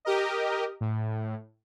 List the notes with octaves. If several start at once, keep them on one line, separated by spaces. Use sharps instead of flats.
G4 A#4 D#5
A2